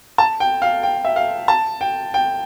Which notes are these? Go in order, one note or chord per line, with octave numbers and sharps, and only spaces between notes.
A5
G5
F5
G5
E5
F5
A5
G5
G5